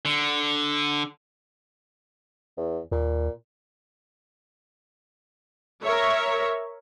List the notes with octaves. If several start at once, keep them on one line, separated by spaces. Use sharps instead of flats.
D3
E2
D#2 A#2
A#4 C#5 E5